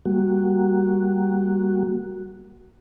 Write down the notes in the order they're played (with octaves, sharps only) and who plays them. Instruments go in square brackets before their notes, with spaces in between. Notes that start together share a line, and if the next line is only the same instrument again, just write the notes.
[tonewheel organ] G3 A#3 F#4